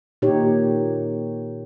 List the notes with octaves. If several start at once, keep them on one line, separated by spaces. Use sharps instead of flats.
A#2 D#4 G4 C#5